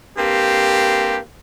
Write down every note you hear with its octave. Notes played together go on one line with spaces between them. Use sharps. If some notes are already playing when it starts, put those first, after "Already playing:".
G2 A#3 C4 G4